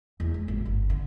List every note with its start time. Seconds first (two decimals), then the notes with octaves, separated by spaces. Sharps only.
0.20 E2
0.34 G#3
0.48 G#1
0.65 G1
0.90 D3